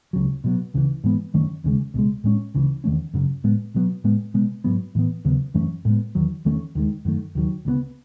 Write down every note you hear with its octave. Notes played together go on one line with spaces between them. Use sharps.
C#2 C#3 F#3
B2 F#3 B3
C#2 C#3 E3
G#2 E3 G#3 B3
F#2 D#3 A3 C#4
D#2 C#3 G#3
C#2 B2 G#3
A2 G#3 C#4
C#2 C#3 E3
E2 D#3 A3 C#4
F#2 C#3 F#3
A2 G#3 B3
B2 F#3 B3
A2 G#3 B3
B2 G#3 B3
G#2 F#3 B3
A2 E3 B3
D#2 C#3 F#3 B3
F#2 E3 A3 C#4
A2 G#3 B3
E2 D#3 F#3
E2 D#3 A3 C#4
D#2 D#3 G#3
F#2 D#3 A3
D#2 D#3 F#3
C#2 C#3 E3 B3